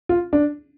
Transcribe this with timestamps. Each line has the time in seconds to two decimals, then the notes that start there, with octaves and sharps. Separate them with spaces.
0.09 F4
0.33 D4